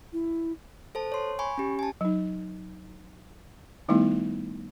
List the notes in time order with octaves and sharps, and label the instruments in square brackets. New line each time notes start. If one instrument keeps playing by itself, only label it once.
[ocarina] E4
[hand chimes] A4 C5 A5
C#5 C6
G#5 B5 C#6
C#4 G4
G#5 A5
[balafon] F#3 D#4
D#3 G3 A3 B3 D#4 E4